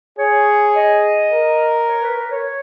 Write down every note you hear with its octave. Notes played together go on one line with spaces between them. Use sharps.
G#4 C#5
D#5
A#4
C#5
B4
B4
C#5